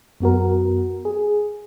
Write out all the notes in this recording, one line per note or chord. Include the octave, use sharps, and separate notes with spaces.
F#2 B3 F#4 A#4
G#4